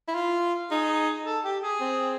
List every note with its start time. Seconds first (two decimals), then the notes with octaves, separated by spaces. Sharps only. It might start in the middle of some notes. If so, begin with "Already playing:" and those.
0.08 E4
0.15 F4
0.71 D#4 G#4
1.25 A4
1.44 G4
1.63 G#4
1.81 C4